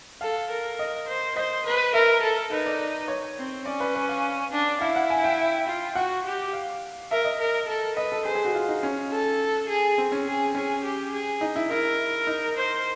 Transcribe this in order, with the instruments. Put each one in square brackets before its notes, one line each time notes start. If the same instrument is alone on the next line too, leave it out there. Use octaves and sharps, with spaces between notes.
[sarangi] A4 [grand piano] F5
[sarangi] A#4
[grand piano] D#5
[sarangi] C5
[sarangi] C5 [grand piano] D#5
[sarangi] B4
[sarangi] A#4 [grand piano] E5
[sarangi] A4
[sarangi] D#4 [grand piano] B4
[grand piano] D5
C#5
[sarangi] C4
[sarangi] C#4 [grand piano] D5
[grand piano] B4
B4
F5
[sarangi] D4
[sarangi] E4 [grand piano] F5
[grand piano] F#5
G#5
G5
[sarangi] F4
[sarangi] F#4 [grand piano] F#5
[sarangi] G4
[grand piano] F5
[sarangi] A#4 [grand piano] E5
[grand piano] D#5
[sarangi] A#4
A4
[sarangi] B4 [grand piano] D#5
[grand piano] A4
[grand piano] G#4 [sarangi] C5
[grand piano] G#4
F#4
F4
D#4
C#4
[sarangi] A4
G#4
[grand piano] C4
C#4
[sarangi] G#4
[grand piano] C#4 [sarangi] G#4
[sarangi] G4
G#4
[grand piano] D#4
E4
[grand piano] E4 [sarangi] A#4
[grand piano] D#4
[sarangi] C5